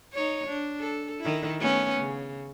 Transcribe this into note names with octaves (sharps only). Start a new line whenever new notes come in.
D#4 C#5
D4
A4
D#3 E4
A3 B3 C#4
C#3